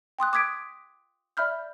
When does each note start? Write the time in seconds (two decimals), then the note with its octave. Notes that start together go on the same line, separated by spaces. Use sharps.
0.19 G5 C6 D#6 F#6
0.33 D6 D#6 G#6 B6 D7
1.37 D5 E5 B5 F6 G6